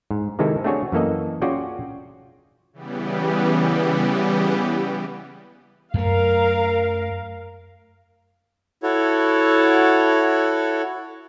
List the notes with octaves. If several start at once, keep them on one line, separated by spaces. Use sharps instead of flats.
G#2
C3 D#3 G#3 C4 E4 A4
A3 C4 D4 F#4 G#4 C#5
F#2 E3 A#3 A4 D#5
C#4 F4 F#4 G#4 D5 G5
C#3 E3 G3 B3 G4
F#2 A3 A#4 F5
E4 F#4 A4 C#5